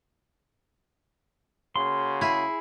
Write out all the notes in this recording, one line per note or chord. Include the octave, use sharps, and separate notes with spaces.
C#3 A#3 F#4 C6
E4 G#4